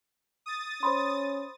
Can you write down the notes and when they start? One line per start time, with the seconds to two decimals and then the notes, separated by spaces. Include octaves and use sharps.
0.46 D#6 A6
0.83 C#4 C5 B5 C6